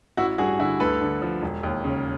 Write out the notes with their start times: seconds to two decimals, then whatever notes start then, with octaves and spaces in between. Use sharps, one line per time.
0.17 A1 E4 F#4
0.38 G2 F#4 G#4
0.59 D3 E4 F#4
0.80 D2 A4 B4
1.01 D3
1.22 F3
1.42 E1
1.63 D#2
1.84 C#3